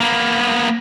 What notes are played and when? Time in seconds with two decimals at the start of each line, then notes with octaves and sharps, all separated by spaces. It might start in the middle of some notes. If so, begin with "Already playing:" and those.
0.01 A#3 B3